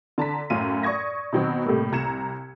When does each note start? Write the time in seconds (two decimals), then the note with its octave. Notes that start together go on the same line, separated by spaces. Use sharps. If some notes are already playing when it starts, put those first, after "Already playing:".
0.18 D3 A5 A#5 B6
0.50 F#2 A2 C#4 F5 D#7
0.83 D5 C#6 D#6 G#6 A#6
1.33 B2 D#3 F#3 B3 C4
1.65 A2 C3 G3 A3 A#3
1.92 C2 A#5 G#6 C#7 E7